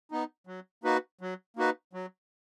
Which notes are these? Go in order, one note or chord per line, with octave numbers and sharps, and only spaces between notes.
B3 D#4
F#3
A#3 D#4 F#4 B4
F#3
A#3 D#4 F#4 B4
F#3